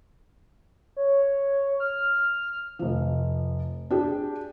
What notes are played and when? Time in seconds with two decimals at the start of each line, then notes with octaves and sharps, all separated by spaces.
0.96 C#5
1.80 F6
2.79 F1 F3
3.91 D4 G4 G#4